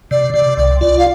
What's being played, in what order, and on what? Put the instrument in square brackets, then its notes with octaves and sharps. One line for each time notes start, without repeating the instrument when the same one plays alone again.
[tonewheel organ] C3 [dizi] D5
[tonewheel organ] C3 [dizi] D5
[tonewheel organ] C2 [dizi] D5
[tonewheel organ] F4 [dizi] D5
[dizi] F5